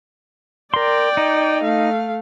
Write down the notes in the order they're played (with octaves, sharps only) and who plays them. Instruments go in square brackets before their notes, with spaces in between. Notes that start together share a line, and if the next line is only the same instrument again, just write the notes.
[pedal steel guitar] A#4 C6 [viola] D5 G5
[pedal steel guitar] D#4
[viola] A3 F5